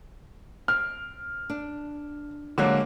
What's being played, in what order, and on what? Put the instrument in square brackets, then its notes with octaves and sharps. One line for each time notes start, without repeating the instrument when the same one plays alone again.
[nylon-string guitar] C4 [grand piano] F6
[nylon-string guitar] D4
[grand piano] D3 A#3 [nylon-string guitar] F#3 G#3 C4